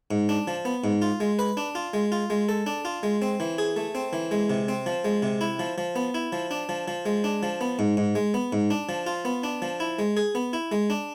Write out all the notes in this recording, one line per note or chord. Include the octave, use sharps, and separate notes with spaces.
G#2
D4
F3
B3
G#2
F4
G#3
B4
D4
F4
G#3
F4
G#3
A4
D4
F4
G#3
C4
E3
G#4
A3
C4
E3
G#3
C3
C4
F3
G#3
C3
E4
F3
F3
B3
E4
F3
D4
F3
F3
G#3
D4
F3
B3
G#2
G#2
G#3
B3
G#2
D4
F3
F4
B3
D4
F3
E4
G#3
G#4
B3
E4
G#3
D4